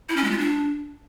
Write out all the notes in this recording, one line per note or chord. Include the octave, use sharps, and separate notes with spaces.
E4
C#4
G#3
F4
D4